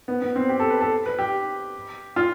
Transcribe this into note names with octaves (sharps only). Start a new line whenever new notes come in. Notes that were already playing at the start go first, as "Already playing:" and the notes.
B3
B3
C4
G4
A4
B4
A4
B4
G4
F4